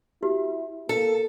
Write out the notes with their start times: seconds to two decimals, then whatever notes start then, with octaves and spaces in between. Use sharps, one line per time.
0.23 E4 F#4 G4
0.89 A#3 A4